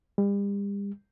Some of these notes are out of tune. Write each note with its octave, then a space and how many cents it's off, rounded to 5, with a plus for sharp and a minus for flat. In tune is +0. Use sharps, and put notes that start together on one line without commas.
G3 +40